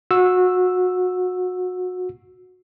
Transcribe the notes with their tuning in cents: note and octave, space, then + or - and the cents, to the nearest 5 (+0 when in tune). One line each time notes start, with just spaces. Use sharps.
F#4 -25 E6 +0